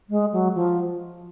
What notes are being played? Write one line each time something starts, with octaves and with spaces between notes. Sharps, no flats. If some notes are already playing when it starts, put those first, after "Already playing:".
G#3
F#3
F3